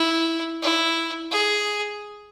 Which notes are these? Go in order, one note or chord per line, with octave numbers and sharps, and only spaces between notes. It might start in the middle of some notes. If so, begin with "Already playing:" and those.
Already playing: E4
E4
G#4